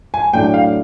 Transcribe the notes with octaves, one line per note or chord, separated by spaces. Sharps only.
G#5
A2 F#3 A3 D4 G5
F5